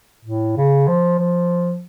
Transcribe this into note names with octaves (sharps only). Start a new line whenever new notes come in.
A2
C#3
F3
F3